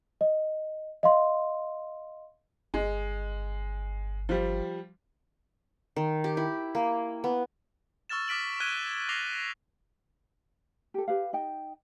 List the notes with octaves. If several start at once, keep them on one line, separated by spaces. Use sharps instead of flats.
D#5
D#5 F5 C6
G1 G#3
F3 G3
D#3
G4
E4
A#3
B3
C#6 E6 F6 A6 E7
D6 F6 B6 D7 F#7
C#6 F6 F#6 G#6 D#7 G7
D6 G#6 A#6 C7 F7 G7
G4 A4
G4 B4 F5
D#4 D#5 G5